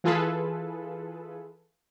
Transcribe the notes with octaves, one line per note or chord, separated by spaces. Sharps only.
E3 F4 G#4 A4 B4